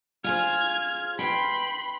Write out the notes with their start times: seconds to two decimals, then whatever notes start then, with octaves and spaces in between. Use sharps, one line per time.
0.24 F4 G#4 C5 F6 G#6
1.19 B4 G5 B5 C6